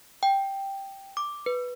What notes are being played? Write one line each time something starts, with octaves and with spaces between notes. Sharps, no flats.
G5
D6
B4